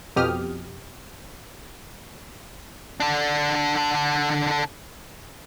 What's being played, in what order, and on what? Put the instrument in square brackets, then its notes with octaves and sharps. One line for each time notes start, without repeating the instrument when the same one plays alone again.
[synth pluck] F2 B2 G4 D#6 F6
[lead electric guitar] D3 D4